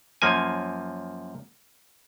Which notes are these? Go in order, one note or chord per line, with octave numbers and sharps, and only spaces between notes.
F#2 F3 A#3 G#5